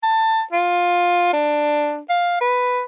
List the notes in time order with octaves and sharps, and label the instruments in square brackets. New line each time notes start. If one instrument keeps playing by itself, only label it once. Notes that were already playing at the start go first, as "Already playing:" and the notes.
[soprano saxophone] A5
F4
D4
F5
B4